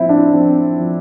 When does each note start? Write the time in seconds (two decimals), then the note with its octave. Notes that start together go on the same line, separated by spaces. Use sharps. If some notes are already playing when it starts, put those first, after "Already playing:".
Already playing: A2 F3 C4 E4
0.09 D4
0.33 F3 C4
0.79 F3